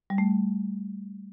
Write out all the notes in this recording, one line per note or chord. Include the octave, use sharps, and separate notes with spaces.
G3
A3